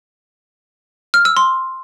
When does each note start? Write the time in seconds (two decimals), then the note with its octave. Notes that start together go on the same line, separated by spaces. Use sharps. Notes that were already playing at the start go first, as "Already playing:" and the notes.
1.14 F6
1.25 E6
1.37 C6